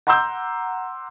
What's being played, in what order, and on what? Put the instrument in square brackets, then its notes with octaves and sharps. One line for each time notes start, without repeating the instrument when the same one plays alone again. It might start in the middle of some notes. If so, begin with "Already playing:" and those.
[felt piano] F#5 A#5 C6 D6 E6 G6